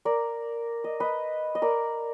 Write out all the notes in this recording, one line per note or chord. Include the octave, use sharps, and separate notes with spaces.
A#4 D5
D#5
B4 D#5
D#5
A#4 D5